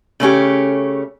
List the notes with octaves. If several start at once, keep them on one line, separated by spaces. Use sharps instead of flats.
C#3 A3 C#4 G4